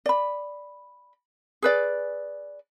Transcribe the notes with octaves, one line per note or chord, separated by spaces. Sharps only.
D5 B5
G#4 B4 D5